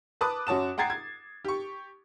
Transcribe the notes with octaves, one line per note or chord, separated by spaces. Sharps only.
B4 A5 D6 D#6 F#6
F#2 F#4 C#5 A5 E7
F#5 G5 A#5 G#6 A6 C7
G#6
G4 C#6